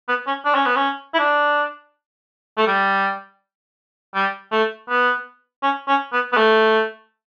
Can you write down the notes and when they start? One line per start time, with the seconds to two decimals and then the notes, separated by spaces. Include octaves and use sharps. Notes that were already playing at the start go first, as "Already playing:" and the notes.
0.08 B3
0.27 C#4
0.45 D4
0.55 C#4
0.66 B3
0.76 C#4
1.14 E4
1.19 D4
2.58 A3
2.67 G3
4.15 G3
4.52 A3
4.89 B3
5.63 C#4
5.88 C#4
6.13 B3
6.33 B3
6.37 A3